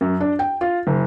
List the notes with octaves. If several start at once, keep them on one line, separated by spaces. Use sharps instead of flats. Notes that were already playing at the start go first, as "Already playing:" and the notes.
F#2
D4
G5
F4
F#1